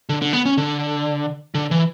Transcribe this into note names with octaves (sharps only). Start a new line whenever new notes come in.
D3
D3
B3
C#4
D3
D3
E3